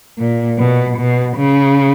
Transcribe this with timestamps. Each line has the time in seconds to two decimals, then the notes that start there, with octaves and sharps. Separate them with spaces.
0.19 A#2
0.59 B2
0.98 B2
1.37 C#3